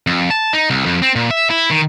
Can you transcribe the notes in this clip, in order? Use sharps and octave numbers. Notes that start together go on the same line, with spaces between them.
F2
A5
D#4
C2
F2
C4
A#2
E5
E4
D#3